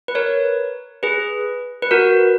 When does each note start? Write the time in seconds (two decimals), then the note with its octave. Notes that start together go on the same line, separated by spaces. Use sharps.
0.08 B4
0.15 A#4 C#5
1.03 G#4 B4
1.82 B4
1.91 F#4 A#4